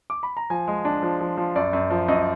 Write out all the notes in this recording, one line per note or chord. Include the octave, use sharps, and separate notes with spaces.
D6
B5
A#5
F3 G#5
G#3
D4
F3
F3
F3
F#2 D5
F#2
F3
F#2 D#5